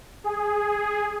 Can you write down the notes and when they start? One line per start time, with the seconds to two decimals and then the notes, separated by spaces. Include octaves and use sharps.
0.24 G#4